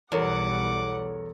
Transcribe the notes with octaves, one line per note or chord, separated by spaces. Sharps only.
B1 E2 G3 A4 A#4 C#5 F#5 D6